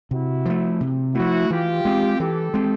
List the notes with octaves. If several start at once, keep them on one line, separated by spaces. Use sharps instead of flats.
C3 E4 F#4
F3 A3
C3
F3 A3 E4 F#4
E3 F4 G4
G#3 C4
E3 G4 A4
G#3 C4